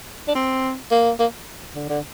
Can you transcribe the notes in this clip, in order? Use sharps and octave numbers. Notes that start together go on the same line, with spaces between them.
D4
C4
A#3
A#3
D3
D3